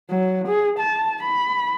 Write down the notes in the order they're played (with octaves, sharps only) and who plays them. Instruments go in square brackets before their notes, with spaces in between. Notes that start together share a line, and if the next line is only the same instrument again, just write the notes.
[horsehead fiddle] F#3
G#4
A5
B5